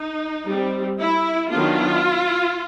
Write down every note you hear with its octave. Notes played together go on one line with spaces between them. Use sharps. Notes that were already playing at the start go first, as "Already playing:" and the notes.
Already playing: D#4
G3 C4
E4
D#3 F#3 B3 D4 F4